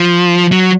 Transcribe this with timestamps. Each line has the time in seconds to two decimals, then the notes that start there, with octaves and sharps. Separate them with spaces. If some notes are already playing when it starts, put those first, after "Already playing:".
Already playing: F3
0.52 F#3